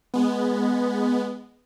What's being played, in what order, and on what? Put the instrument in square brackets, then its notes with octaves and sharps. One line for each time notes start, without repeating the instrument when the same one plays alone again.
[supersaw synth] G#3 B3